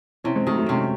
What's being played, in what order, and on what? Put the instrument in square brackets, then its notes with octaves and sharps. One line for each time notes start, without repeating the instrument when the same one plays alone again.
[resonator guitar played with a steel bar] C3 [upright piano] C#4 E4
[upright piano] G#3 C4
[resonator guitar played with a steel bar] D#3 [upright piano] F#3 A3
[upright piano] F#3 A3
[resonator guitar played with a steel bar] C3 [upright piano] A3 C#4